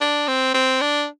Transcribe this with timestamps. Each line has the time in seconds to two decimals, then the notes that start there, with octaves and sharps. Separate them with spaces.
0.01 D4
0.28 C4
0.54 C4
0.81 D4